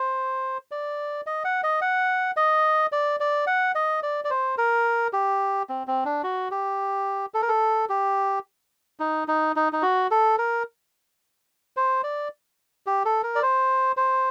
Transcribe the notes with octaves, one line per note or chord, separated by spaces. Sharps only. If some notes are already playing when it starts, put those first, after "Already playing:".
Already playing: C5
D5
D#5
F#5
D#5
F#5
D#5
D5
D5
F#5
D#5
D5
D5
C5
A#4
G4
C4
C4
D4
F#4
G4
A4
A#4
A4
G4
D#4
D#4
D#4
D#4
F#4
A4
A#4
C5
D5
G4
A4
A#4
D5
C5
C5